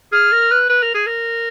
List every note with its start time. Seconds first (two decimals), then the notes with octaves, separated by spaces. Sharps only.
0.12 G#4 F6
0.32 A#4
0.51 B4
0.70 B4
0.83 A#4
0.94 G#4
1.06 A#4